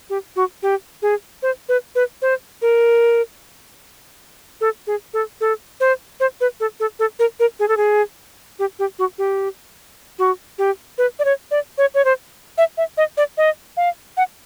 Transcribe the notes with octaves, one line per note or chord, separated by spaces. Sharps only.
G4
F#4
G4
G#4
C5
B4
B4
C5
A#4
A4
G#4
A4
A4
C5
C5
B4
A4
A4
A4
A#4
A#4
G#4
A4
G#4
G4
G4
F#4
G4
F#4
G4
B4
D5
C#5
D5
C#5
C#5
C5
E5
E5
D#5
D5
D#5
F5
F#5